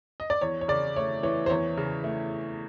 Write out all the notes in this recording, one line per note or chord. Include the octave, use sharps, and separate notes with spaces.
D#5
D5
E2 C#5
C#5
C#3 D5
A3 C#5
E3 C#5
C5
E2 C#5
C#3
A3